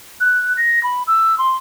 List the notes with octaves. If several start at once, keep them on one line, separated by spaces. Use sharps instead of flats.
F#6
A#6
B5
E6
C6